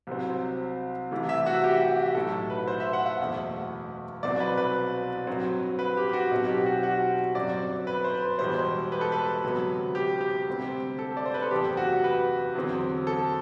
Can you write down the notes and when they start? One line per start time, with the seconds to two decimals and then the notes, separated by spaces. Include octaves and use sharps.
0.07 C2 C3 F#3 C4
1.11 C2 C3 E3 A3
1.29 E5
1.46 F#4
1.64 G4
2.15 B1 A2 F#3 A4
2.50 B4
2.67 C5
2.80 E5
2.93 F#5
3.06 F#5
3.19 F#1 E2 B2 A3
4.23 C2 B2 F#3 C4 D5
4.40 B4
4.57 B4
5.27 G2 F#3 C4
5.79 B4
5.97 G4
6.10 G4
6.13 F#4
6.31 B1 B2 F#3 C4
6.48 G4
6.66 F#4
6.83 F#4
7.35 G1 F#2 F#3 C4 D5
7.87 B4
8.04 C5
8.14 B4
8.39 E1 E2 B2 G3 C5
8.92 B4
9.01 A4
9.12 B4
9.43 D2 C3 F#3 B3
9.95 G4
10.21 G4
10.48 D2 C3 G3 C4
10.99 A4
11.17 D5
11.26 C5
11.34 B4
11.43 A4
11.51 F#1 E2 C3 G4
11.77 F#4
12.04 B4
12.55 E2 D3 F#3 C4
13.07 A4